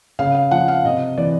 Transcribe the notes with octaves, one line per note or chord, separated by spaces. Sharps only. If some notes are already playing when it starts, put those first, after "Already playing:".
C#3 F5
F5
F3 F#5
F5
C3 D#5
E3 D5